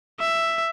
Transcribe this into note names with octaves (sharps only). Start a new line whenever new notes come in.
E5